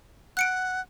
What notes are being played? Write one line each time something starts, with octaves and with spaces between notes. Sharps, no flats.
F#5 F#6 C#7 D7